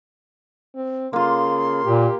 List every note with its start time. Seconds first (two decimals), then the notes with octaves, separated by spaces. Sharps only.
0.75 C4
1.13 C#3 A#3 F4 C6
1.85 A#2 G4